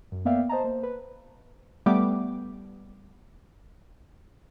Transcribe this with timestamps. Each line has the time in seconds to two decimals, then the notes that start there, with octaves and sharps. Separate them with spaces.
0.12 F#2
0.25 A#3 B3 D5 E5 F5 G5
0.49 C5 D#5 A5 A#5
0.64 A#3 C5
0.83 B4
1.86 G3 A3 B3 G4 D6